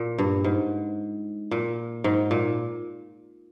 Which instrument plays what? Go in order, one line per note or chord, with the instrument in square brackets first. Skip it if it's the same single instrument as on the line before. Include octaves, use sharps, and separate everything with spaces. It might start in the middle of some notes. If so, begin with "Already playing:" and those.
Already playing: [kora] A#2
G2
G#2
A#2
G#2
A#2